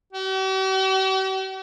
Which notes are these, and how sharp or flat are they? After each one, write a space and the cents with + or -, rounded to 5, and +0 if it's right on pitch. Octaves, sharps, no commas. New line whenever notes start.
G4 -45